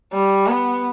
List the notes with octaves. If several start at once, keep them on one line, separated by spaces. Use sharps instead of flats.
G3
B3